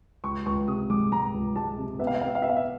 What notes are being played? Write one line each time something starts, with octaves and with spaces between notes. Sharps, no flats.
C#2 C#6
C#2 C#6
C3 D#6
G#3 D6
G#3 A#5
C#2
G#3 A5
C3
B3 E5
F5
E5
B3 F5
E5
F5
B3 E5
F5
E5